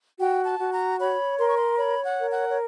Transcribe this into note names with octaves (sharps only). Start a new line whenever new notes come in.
F#4 G5
A5
F#4
A#5
C#5 B5
A#4 C6
C#6
C6
C#5 B5
F#5
A#4
F#5
C#5